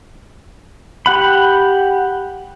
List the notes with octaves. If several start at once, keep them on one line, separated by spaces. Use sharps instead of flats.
G4 F#5 B5